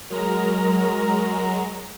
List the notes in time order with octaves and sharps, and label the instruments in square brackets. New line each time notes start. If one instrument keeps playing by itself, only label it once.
[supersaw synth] F#3 G#3 A#5 [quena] A#4